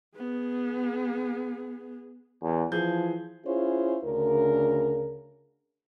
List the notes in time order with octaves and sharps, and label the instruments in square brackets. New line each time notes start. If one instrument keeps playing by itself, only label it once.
[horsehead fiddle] B3 G#4
[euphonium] E2
[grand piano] E3 G#4 G6 [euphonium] F3
[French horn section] C#4 E4 F4 G#4 C5 C#5
D2 C#3 D4 A#4